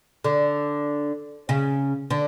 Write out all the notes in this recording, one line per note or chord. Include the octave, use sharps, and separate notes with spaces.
D3
C#3
D3